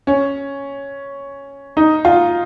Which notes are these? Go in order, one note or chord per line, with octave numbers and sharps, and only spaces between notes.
C#4
D#4
F4